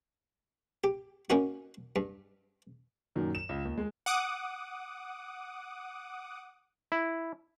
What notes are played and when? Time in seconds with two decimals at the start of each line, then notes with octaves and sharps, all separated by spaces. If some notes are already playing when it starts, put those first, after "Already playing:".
0.84 G4
1.30 A#3 C#4 D#4 F#4
1.96 G2
3.15 F#2 A#2 D#3 F#3
3.35 E7
3.49 C#2
3.65 D#2
3.78 G#3
4.06 F#5 D6 D#6
6.92 E4